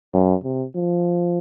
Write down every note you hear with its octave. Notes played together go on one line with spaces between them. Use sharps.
F#2
C3
F3